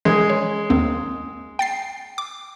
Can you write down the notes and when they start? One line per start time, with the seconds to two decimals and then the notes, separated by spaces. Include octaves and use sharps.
0.05 E3 G#3 C#4
0.30 C#5
0.70 D#2 A#3 C4
1.59 G5 A6 C7
2.18 D6